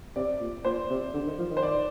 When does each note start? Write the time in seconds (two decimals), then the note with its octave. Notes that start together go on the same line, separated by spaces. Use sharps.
0.16 C3 D5
0.40 A#2
0.65 A#2 C5
0.90 C3
1.14 D3
1.26 D#3
1.38 F3
1.50 D#3
1.57 C5
1.63 D5